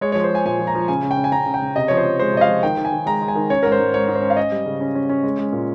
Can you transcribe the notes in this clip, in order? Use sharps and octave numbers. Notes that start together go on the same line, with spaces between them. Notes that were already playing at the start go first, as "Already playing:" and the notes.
G#3 C#5
C#5
F3
C5
G#3 G#5
A#2 G#5
F3
A#5
F3
C#3 G#5
C#3
G5
C#3
G#5
C#3 A#5
C#3
G5
C#3
C3 D#5
F3 C#5
C5
F3
G#3 C5
C3 D#5
F5
F3
D#3 G5
D#3
G#5
D#3
G#3 A#5
G#3
G#5
D#3
C#4 C#5
G#2 A#4
C5
G#2
G#2 C#5
G#2
C5
C#4
F5
C#4 D#5
G3
C#3
C#4
C#4
C#4
G#3
G#3
A#2